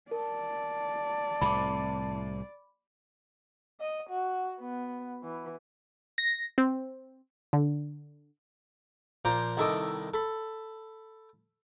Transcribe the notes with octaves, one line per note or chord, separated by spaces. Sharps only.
A#4 D5 A5
C2 A2 C3 B5 D6
D#5
F#4
B3
E3
A#6
C4
D3
A#2 F3 C5 A#5 D6
C2 D#3 E4 A4 D#5 D6
A4 B5